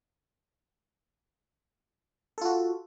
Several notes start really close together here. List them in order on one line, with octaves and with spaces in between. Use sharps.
A4 F4 F#4